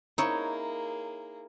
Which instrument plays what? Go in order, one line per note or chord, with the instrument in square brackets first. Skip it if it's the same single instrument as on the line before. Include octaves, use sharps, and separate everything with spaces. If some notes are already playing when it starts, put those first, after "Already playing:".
[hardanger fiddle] A#3 G#4 [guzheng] D#4 E4 C#5